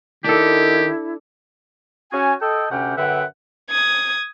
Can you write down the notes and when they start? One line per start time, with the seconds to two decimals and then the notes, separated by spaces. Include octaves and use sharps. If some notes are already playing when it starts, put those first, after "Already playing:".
0.24 D#3 D4 E4 G4 A4
2.12 C#4 F#4 G#5
2.41 A4 D#5 G5
2.71 D2 C3 C#4 F#5 G5
2.97 F#2 D3 B4 E5 F#5 G5
3.70 D#6 G#6